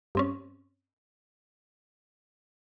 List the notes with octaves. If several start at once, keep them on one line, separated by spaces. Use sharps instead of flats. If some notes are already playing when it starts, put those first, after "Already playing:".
G2 C4 C#4